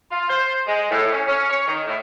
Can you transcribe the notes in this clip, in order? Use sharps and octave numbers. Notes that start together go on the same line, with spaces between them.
F4
C5
G#3
A2
C#4
C#4
C#5
D#3
A2